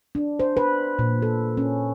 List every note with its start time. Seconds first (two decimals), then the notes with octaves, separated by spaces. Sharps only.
0.15 D4
0.40 C5
0.57 B4
0.99 A#2
1.22 A4
1.57 C#4